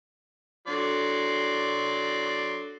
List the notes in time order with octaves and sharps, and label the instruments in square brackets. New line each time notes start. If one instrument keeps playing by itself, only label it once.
[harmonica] F#3 D5 C6 [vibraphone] D4 A4